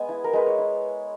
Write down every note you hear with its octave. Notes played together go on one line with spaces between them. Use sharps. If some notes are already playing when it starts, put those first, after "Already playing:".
Already playing: G#3 B3 G#5
E4
A#4
G#3 B4
C#5
E4